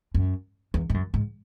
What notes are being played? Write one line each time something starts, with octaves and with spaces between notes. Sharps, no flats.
F#2
E2
G#2
F#2
G#2